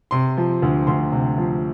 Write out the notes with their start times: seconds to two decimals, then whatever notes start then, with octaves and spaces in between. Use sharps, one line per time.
0.11 C3 C6
0.37 F3
0.62 D2
0.87 D2 C6
1.12 C3
1.38 F3